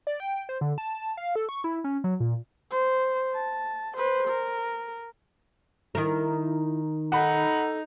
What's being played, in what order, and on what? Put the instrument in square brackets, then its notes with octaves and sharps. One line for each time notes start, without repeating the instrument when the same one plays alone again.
[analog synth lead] D5
G5
C5
D3
A5
F5
A4
C#6
E4
C#4
F#3
A#2
[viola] C5
A5
B4 C5
A#4
[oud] D#3 A#4 [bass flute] E4
[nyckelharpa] D#4 [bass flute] A4 [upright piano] F#5 B5